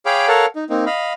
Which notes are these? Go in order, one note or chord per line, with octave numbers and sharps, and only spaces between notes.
G#4 C#5 F5 G5 B5 D6
A4 A#4 C#5 F5 F#5 A5
D#4
A#3 C4 D#4
D#5 F5 B5